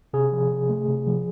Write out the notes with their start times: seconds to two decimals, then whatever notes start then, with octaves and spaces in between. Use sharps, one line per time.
0.13 C3 G#4
0.32 F3
0.51 C3
0.69 A3
0.88 C3
1.07 F3